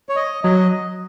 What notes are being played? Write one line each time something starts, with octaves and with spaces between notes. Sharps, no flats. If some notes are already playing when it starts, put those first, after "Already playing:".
C#5
D#5
F#3 D#5